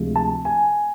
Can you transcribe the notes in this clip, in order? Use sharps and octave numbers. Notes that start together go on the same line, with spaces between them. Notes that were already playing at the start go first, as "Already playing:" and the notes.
Already playing: D2 C3 F3 G#3
A5
G#5